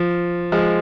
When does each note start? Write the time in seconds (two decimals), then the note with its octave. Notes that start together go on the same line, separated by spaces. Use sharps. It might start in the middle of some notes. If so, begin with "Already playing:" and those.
Already playing: F3
0.52 F3 G#3